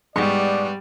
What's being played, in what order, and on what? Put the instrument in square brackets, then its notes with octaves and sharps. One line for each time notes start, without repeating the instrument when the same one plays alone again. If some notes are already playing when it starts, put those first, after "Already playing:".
[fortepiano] G#2 [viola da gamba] G3 [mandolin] B3 C#6 [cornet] D5